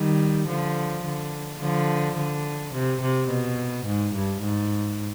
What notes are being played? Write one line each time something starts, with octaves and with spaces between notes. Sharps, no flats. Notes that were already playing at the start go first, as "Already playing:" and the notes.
Already playing: D#3 G3
D3 F3
D3
D3 F3
D3
C3
C3
B2
G#2
G2
G#2